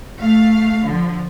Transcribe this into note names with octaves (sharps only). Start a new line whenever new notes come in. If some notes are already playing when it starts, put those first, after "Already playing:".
A3 F5
D3 F3